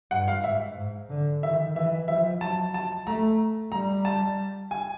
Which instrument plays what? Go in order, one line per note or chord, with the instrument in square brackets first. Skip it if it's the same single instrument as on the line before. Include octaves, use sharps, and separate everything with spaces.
[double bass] G2 [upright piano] F#5
[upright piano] F5
[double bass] G#2 [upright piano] E5
[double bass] G#2
D3
[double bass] D#3 [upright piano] E5
[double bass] E3 [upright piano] E5
[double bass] F3 [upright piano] E5
[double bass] F#3 [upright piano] A5
[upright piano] A5
[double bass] A3 [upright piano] A#5
[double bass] G3 [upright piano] A#5
[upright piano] A5
G#5